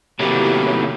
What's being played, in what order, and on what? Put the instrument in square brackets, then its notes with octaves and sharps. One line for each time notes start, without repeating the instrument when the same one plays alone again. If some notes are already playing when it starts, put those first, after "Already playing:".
[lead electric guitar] A2 F#3 [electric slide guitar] C3 D#3 [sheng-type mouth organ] A#3 B3 E4 [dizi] G4